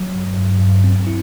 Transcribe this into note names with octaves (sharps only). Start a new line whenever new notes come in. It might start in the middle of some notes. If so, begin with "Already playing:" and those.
Already playing: F#3
G2
G2
G2
C4
E4